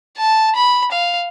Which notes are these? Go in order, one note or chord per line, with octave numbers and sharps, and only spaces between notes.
A5
B5
F5